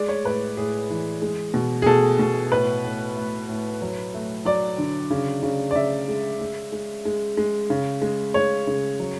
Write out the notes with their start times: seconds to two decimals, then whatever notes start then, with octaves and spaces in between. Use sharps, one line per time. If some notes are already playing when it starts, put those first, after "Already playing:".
Already playing: G#3 D5
0.09 C#5
0.24 A2 B4
0.57 A2 G#4
0.90 E3
1.22 G#3
1.54 B2
1.82 G#4
1.86 B2 A4
2.19 B2
2.51 A2 B4
2.84 A2
3.16 A3
3.49 A2
3.82 F#3
4.14 A3
4.45 F#3 D5
4.78 D3
5.10 C#3
5.43 C#3
5.71 D5
5.75 C#3 E5
6.08 G#3
6.40 G#3
6.72 G#3
7.05 G#3
7.37 G#3
7.70 C#3
8.02 G#3
8.34 G#3 C#5
8.67 C#3
8.99 F#3